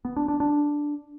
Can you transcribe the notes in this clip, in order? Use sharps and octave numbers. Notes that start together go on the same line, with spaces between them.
B3
D4
D4
D4